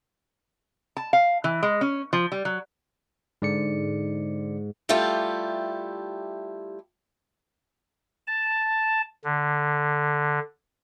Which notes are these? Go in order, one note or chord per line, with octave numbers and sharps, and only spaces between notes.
A5
F5
E3
G#3
C#4
F3
G3
F#3
G#2 D3 D5 C#7
G3 A3 E4 F4 G4
A5
D3